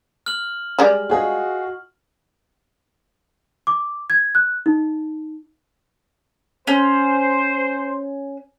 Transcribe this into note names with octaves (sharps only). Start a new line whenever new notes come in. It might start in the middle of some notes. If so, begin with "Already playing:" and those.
F6 F#7
G3 G#3 D5
F4 F#4 G#4 D#5
D6
G#6
F#6
D#4
C#4 C5